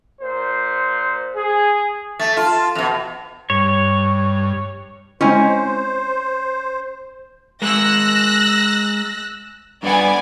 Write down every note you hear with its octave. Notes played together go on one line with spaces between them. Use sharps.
A#2 C5
G#4
A3 A6
F4 A5
F2 B2 F7
G2 C#5
G#3 C4 C#4 E4 C5 D#5 G#5
G#3 A#4 E6 F#6 A#6
G2 B3 D5 F#5 G#5